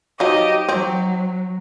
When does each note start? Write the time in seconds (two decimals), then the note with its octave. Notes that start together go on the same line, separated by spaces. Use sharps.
0.20 F3 F#3 D#4 G4 D#5
0.69 F#3 C4